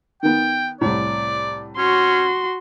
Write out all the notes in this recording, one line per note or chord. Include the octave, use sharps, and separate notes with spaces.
D#3 B3 G5
C2 A2 D5
C#4 F#4 C6